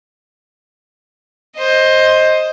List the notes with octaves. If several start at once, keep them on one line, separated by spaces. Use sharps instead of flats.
C5 D#5